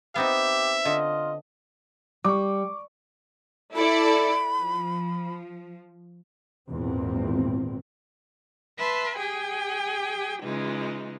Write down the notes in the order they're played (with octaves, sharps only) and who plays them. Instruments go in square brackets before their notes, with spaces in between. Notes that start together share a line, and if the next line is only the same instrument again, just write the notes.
[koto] B3 C4 D#4 [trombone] G4 [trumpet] E5
[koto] D3 [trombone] F4 [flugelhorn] D#5
[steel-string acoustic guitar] G3 [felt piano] C#6 D6
[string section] E4 A4 D5 [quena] B5
[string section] F3
[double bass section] G#1 E2 A#2 C4
[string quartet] B4 E5 A5 C6
G4 G#4 G5 G#5
C#3 E3 G#3 D#4 F4